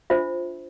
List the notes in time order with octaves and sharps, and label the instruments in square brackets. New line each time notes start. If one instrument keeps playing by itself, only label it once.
[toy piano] D4 F4 C5 E5